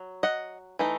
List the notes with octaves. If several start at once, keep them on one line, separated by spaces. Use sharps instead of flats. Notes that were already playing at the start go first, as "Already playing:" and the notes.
Already playing: F#3
D#5 F#5
E3 A3 D#4